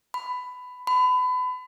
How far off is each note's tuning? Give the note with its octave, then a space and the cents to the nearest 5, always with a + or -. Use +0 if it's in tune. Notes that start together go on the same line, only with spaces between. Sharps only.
B5 +15
B5 +30